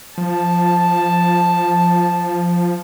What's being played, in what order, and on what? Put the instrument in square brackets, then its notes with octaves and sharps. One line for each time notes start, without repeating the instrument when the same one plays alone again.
[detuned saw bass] F3 [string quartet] A5